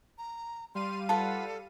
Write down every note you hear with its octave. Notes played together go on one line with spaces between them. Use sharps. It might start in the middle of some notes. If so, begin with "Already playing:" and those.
A#5
G3 F5 C6 D#7
F4 A4 B4 F#5 A5